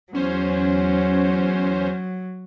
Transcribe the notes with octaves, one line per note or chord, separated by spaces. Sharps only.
E2 F#3 C#4 C5